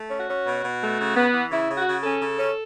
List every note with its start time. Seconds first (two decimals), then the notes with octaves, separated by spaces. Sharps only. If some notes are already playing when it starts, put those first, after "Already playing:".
Already playing: A3
0.10 C#4
0.19 F#4
0.29 C#4
0.46 B2
0.63 B2
0.82 A3
0.99 C#3
1.16 B3
1.34 E3
1.51 C#3 E4
1.70 C#3
1.77 F#4
1.86 C#3
2.04 C#4 A4
2.22 C#3
2.39 C#4